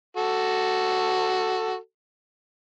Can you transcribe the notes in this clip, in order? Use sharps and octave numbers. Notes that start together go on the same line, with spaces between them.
F#4 A4